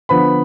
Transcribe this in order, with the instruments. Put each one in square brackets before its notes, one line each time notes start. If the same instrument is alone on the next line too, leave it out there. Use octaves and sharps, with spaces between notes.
[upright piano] D3 F3 B3 B5